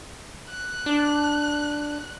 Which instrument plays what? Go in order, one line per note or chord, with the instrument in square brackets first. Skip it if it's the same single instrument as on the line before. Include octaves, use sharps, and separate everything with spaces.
[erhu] F#6
[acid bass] D4